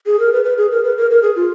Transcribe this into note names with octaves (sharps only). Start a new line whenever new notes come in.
G#4
A#4
B4
B4
G#4
A#4
B4
A#4
A#4
G#4
F4